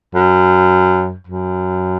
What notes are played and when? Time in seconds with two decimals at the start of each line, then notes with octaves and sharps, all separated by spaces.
0.15 F#2
1.27 F#2